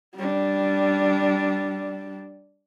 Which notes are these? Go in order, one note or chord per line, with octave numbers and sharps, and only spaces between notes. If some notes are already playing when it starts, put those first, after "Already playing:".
G3 D4